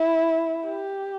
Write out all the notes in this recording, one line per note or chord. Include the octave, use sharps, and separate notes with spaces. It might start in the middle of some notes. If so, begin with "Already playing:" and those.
Already playing: E4
G4